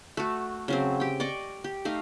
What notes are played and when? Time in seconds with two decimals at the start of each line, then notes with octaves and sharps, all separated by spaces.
0.17 A3 F#4
0.68 C#3 F#3 C4
1.00 G4 G5
1.20 D5 D#5 C#6 D6
1.64 G4
1.85 A3 D#4 F5